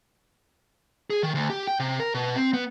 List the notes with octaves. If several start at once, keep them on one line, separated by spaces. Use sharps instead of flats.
G#4
D#3
D2
G4
G5
C3
A#4
B2
C4
B3